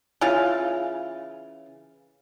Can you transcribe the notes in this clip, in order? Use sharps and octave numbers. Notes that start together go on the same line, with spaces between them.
C#3 E3 F4 F5